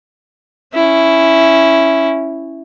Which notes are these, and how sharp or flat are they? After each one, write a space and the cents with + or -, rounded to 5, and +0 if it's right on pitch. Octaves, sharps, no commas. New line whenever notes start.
C#4 +0 E4 +0